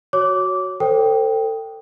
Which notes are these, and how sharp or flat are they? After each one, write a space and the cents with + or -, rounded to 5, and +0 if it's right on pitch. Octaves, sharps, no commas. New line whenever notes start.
F#4 +0 C#5 +0 D6 -15
A4 +30 C5 -10 G5 +0